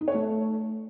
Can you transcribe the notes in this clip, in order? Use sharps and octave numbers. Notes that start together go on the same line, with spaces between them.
D#4
C#5
A3